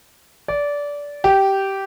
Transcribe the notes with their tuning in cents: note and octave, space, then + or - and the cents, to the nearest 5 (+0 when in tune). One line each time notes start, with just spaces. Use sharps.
D5 -20
G4 -10